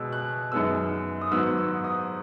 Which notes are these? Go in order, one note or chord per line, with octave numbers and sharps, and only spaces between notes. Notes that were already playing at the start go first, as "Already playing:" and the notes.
Already playing: B2 G#3 B3 E6 F#6
F#6
F#2 D#3 G#3 B3 E6
D#6
G#2 D#3 F#3 B3 E6
E6
D#6